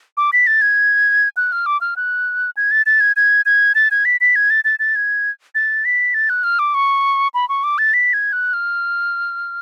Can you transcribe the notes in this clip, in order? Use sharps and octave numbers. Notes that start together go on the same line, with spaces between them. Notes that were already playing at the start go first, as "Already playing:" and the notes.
D6
B6
A6
G#6
F#6
F6
D6
F6
F#6
G#6
A6
A6
G#6
G#6
G#6
A6
G#6
B6
B6
G#6
A6
A6
A6
G#6
A6
B6
A6
F#6
F6
D6
C#6
B5
C#6
D6
A6
B6
G#6
F#6
F6